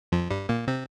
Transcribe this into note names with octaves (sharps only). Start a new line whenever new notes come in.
F2 F3
G2 G3
A#2 A#3
C3 C4